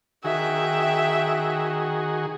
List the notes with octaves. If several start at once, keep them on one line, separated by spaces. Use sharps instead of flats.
D#3 F#4 G#4 E5 G5